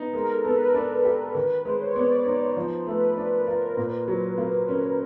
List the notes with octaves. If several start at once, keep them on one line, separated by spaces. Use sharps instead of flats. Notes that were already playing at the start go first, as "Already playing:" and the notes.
Already playing: B3 D#4
G#3 A#4
A4
B3 B4
A#4
D4
G4
D#3 B4
B4
G#3 C5
C#5
B3 D5
D5
D#4
C5
F3 C5
A3 B4
D4 B4
A#4
F4
A#4
A#2
F#3
A#3
C#4